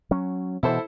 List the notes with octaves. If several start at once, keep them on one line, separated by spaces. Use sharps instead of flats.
F#3 C#4
B2 E3 E4 A4 C5